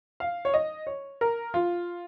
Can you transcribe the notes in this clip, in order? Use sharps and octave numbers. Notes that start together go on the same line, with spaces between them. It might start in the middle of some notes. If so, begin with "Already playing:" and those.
F5
C#5
D#5
C#5
A#4
F4